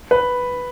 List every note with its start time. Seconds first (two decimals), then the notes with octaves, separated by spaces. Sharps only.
0.11 B4